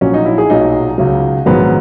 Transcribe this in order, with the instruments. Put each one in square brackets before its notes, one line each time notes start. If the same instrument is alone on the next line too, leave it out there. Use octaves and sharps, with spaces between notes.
[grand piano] A#1 A#2 F#3 C#4
D#4
E4
G#4
B1 A#2 F#3 D#4
C#2 C#3 F#3
A#1 G#2 D#3 F#3 B3